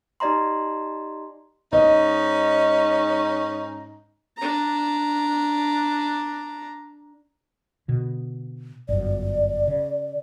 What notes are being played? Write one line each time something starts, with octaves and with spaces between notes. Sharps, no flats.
D#4 G4 D5 D#5 A#5 C6
G#2 C#4 D#4 D#5
D4 A#5
B2 D3
G1 F#2 D5
C#3